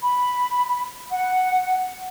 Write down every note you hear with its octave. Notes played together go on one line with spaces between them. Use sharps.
B5
F#5